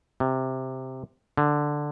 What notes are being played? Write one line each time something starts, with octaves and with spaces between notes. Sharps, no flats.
C3
D3